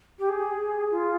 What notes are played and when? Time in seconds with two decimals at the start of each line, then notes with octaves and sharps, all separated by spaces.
0.18 G4
0.28 G#4
0.91 F4